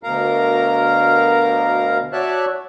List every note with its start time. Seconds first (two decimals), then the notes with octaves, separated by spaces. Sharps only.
0.03 D2 B2 A#4 F5 A#5
2.13 F#4 C#5 D5 E5 A5 F#6